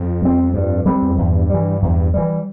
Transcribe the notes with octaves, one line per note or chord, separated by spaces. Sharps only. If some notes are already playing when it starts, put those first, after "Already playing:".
Already playing: F2
G3 C4
G2
G3 C4
E2
F2
E2 G2
E3 G3
E2
E3 G3